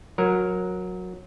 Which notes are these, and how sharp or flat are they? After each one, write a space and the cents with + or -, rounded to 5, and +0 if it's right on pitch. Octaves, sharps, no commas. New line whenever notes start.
F#3 -20 A#4 +0